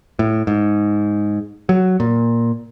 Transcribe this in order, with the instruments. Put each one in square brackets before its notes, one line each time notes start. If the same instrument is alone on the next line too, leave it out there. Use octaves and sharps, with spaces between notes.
[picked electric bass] A2
G#2
F#3
A#2